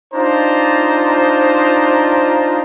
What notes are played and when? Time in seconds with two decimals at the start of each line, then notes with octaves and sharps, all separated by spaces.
0.14 D4 D#4 F4 C5 A#5